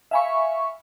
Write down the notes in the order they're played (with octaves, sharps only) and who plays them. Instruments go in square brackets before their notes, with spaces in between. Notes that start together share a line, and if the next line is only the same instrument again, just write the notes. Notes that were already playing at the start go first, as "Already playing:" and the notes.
[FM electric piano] E5 F5 G#5 B5 C#6